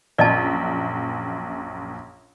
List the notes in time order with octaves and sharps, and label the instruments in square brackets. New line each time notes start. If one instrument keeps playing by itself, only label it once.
[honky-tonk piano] A#1 F#2 [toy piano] D5 D#5 A5